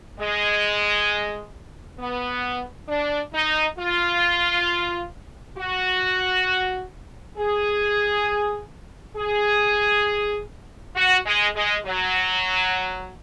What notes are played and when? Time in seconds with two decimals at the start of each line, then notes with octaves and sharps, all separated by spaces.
0.19 G#3
1.99 B3
2.88 D4
3.33 D#4
3.79 F4
5.58 F#4
7.37 G#4
9.16 G#4
10.95 F#4
11.25 G#3
11.55 G#3
11.85 F#3